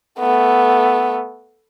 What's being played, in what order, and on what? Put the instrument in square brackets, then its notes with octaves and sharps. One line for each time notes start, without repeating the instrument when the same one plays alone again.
[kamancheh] A3 B3